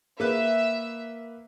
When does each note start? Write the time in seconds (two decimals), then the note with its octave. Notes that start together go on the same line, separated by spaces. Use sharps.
0.20 A#3 B4 E5